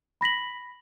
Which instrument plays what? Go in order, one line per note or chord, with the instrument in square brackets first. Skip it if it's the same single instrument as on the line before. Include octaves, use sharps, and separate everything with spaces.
[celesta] B5 A#6 B6 F#7